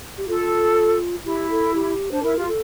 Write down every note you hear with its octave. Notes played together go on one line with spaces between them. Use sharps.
G4
F4 A4
E4 G4
A4
G4
D4 C5
E4 A#4
F4 G4
A4